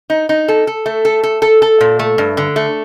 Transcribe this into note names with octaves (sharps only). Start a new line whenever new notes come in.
D#4
D#4
A4
A4
A3
A4
A4
A4
A4
A#2
A3
G2
D3
A3